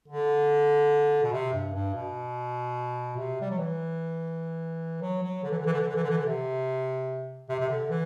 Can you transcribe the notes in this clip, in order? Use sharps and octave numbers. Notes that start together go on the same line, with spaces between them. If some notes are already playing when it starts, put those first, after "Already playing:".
D3
B2
C3
G2
G2
B2
C3
G3
F#3
E3
F#3
F#3
D3
E3
D3
E3
D3
E3
D3
E3
D3
E3
D3
C3
C3
C3
D3
E3